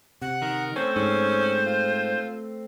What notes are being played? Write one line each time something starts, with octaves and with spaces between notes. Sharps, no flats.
C3 F#5
D#3 A#4
A3 C4 C#4 C5
G#2 C#4
F4